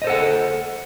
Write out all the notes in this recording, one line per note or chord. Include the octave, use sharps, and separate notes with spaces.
A4 C5 D#5 F#5